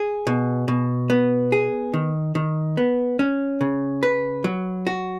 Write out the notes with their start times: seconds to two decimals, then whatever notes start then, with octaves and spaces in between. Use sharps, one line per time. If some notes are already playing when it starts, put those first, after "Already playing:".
Already playing: G#4
0.27 B2
0.68 B2
1.10 B3
1.52 G#4
1.94 D#3
2.35 D#3
2.77 B3
3.19 C#4
3.61 C#3
4.03 B4
4.44 F#3
4.87 F#4